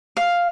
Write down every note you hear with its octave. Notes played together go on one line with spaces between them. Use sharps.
F5